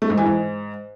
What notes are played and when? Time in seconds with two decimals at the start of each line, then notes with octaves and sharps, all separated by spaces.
0.02 A3
0.10 G#2
0.17 E3
0.25 G#2